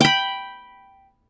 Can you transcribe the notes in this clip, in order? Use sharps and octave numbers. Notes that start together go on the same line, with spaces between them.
G5 B5